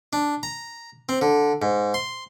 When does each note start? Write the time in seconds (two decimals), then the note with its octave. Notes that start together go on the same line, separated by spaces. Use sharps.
0.13 D4
0.43 A#5
1.09 C4
1.22 D3
1.62 G#2
1.94 C6